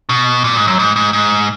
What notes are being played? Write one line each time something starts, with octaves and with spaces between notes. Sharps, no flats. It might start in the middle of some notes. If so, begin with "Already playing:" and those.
B2
A#2
G#2
F#2
G#2
G#2
G#2